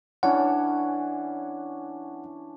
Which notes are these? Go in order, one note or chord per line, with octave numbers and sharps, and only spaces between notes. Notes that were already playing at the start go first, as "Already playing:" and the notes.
E3 C#4 D4 F#5